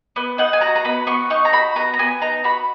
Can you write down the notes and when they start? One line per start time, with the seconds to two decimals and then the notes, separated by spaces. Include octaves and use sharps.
0.16 B3
0.38 D#4 F#5
0.53 G#5
0.61 F#4 A#5
0.75 A#5
0.85 B3 B5
1.07 B3 C#6
1.30 D#4 C#6
1.45 A#5
1.53 F#4 B5
1.76 B3 A#5
1.94 A#5
1.99 B3 G#5
2.21 D#4 A#5
2.44 F#4 B5